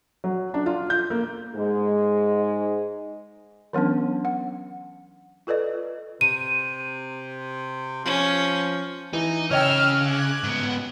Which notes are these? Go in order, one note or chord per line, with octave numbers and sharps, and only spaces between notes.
F#3
D4
F4
G6
A#3
G#2 G#3
E3 F#3 B3 C#4 D4
F#5
F4 A4 B4 D5 D#5
C3 D#7
F3 C#4
E3 D#4
C#3 C#5 D#5 G5 E6 F6
D6 F#6 G#6
G#2 B3